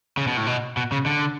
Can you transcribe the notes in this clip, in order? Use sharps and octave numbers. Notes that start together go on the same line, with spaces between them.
C#3
B2
A2
B2
B2
C#3
D3